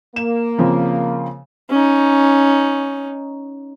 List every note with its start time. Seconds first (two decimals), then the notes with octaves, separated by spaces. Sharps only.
0.16 A#3 E7
0.58 C#3 F3 C4
1.70 C#4 D#4